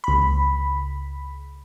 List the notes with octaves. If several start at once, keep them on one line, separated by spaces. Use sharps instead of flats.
C#2 B5